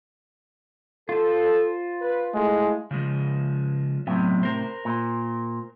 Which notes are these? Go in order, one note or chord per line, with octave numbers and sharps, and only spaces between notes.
F4 A4 C5
B4
G#3 A3 E4
C#3 F3 G#3
A2 C3 F#3 B3
A#4 C5
A#2